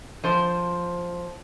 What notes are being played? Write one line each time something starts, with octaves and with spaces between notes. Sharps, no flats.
F3 C5